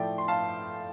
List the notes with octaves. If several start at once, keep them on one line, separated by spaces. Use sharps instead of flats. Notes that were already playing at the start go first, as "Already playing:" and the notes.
Already playing: A2 F3 A3 D5 G5
C6
F5 A5